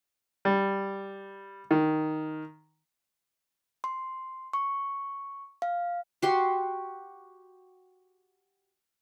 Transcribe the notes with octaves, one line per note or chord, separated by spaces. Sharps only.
G3
D#3
C6
C#6
F5
F#4 G4 C6